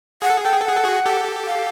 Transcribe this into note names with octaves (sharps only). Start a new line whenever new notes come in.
G#4 F#5
A4
G#4
A4 G5
G#4
A4
G#4 F#5
A4
F#4 G#4
G4 A4
F5